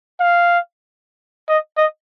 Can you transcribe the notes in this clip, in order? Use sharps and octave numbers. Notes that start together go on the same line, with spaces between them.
F5
D#5
D#5